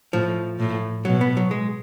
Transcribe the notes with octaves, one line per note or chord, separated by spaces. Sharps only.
A2 F3
A2
B2 F#3
B3
F#3
G#3